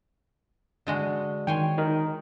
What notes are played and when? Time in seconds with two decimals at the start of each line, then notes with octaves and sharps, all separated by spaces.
0.87 D3 G#3 F#4
1.47 D#3 C#5 G5 G#5 C6
1.78 D#4 A#4